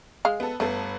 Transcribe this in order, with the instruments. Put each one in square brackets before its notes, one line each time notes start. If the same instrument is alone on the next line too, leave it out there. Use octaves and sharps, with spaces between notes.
[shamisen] G#3 F5
[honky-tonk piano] B3 A4
[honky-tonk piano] G1 B3 A4 [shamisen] A3